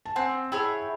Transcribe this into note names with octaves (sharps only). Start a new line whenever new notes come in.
A5
C4 F#5 G#5
E4 G#4 C#5 G5 A5